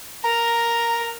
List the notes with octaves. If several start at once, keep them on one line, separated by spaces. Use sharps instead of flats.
A#4 A#5